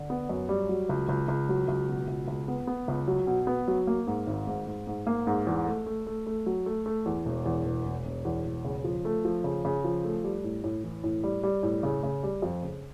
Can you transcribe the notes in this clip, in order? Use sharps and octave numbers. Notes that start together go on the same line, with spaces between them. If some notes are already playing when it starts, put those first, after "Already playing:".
Already playing: D3
B3
F#2
G3
F#3
C#2
C#2
C#2
F#3
C#2
B2
C#2
C#2
B3
B3
C#2
F#3
B2
B3
F#3
A#3
G#2
G#1
G#2
G#2
G#2
A#3
G#2
E2
A3
A3
A3
A3
F#3
A3
A3
E2
E1
E2
E1
E1
E1
E2
E1
C#3
F3
A3
F3
C#3
C#3
F3
A3
G3
A2
A2
E3
A2
G3
G3
A2
C#3
C#3
G3
F2
C#3